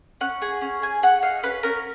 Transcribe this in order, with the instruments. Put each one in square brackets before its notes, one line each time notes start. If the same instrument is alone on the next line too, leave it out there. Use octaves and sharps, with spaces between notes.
[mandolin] C#4 F#5
G#4
C#4
G#4 G#5
G#4 F#5
D#4 F5
C#4 B4
C#4 A#4